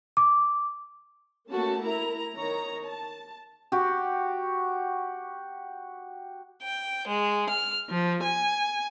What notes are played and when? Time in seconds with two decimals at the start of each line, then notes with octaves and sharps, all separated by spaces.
0.17 D6
1.49 A3 A#3 C#4 F#4 A5
1.83 E4 A#4 A#5
2.36 D#3 C#5 A#5
2.85 A5
3.72 F#4 G4
6.63 G5
7.07 G#3
7.49 F6
7.89 F3
8.22 G#5